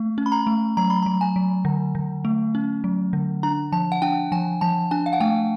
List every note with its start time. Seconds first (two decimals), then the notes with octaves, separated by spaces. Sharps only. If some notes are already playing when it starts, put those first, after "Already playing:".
Already playing: A3
0.18 C#4
0.26 B5
0.32 A#5
0.47 A3
0.77 F#3 A#5
0.90 B5
1.03 A#5
1.06 F#3
1.21 G#5
1.36 F#3
1.65 D3
1.95 D3
2.25 A3
2.55 C#4
2.84 F#3
3.13 D3
3.43 D4 A#5
3.72 F3 A5
3.92 F#5
4.02 D4 G5
4.32 F3 G#5
4.61 F3 A5
4.91 D4 G#5
5.06 F5
5.13 F#5
5.20 A3 G5